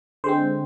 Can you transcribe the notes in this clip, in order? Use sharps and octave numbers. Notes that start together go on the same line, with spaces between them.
D3 G#3 C4 C5